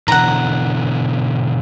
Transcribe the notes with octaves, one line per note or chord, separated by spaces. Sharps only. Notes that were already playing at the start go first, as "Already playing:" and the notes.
B2 D3 E3 F#5 A#5